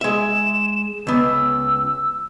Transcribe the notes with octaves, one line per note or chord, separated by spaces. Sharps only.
G#3 E5 E7
C#2 B3 E6